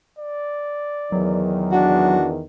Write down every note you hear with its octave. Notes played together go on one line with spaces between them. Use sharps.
D5
E2 D#3 F#3
D4 F#4